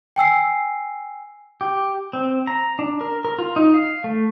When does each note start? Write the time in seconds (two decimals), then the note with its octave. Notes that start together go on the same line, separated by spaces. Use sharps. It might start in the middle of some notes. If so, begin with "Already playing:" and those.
0.16 G5 G#5 E6 C7
1.61 G4
2.13 C4
2.47 A#5
2.79 D4
3.01 A#4
3.25 A#4
3.39 F4
3.56 D#4
3.74 F5
4.04 A3